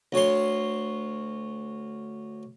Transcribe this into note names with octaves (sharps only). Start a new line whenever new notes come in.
D2 C#5 C6